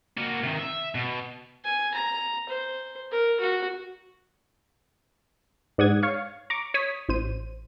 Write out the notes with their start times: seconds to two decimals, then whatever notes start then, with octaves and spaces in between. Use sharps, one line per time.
0.17 A#3 F#4
0.43 C3 D#3
0.59 E5
0.95 B2
1.64 G#5
1.94 A#5
2.49 C5
3.11 A#4
3.40 F#4
5.78 G#2 D5 F#5 D#6 G#6
6.03 C#5 F5 C#6
6.50 A#5 C#6 D6
6.74 C#5 D#6 B6
7.09 A1 C5 D#7